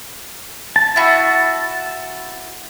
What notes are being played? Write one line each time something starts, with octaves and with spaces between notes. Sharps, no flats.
A5
E4 F#4